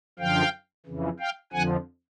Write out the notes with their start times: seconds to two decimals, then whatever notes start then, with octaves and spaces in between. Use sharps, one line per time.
0.19 F#2 D3 F3 F5 G5
0.86 F2 C#3 E3
1.19 F5 G5
1.52 F2 D3 F3 F#5 G#5